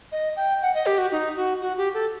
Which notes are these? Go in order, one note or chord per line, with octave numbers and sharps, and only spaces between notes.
D#5
G5
F#5
D#5
G4
F#4
D#4
F#4
F#4
G4
A4